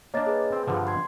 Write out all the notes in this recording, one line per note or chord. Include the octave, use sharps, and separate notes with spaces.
A#3 D4 C#5 D#5 A6
G#4 B4
C4
G2 D3 F3
C6 G#6